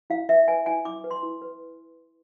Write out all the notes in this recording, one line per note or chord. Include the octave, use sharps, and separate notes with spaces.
E4 F5
B4 E5
B4 G#5
E4 G#5
E4 D6
B4
C6
E4
B4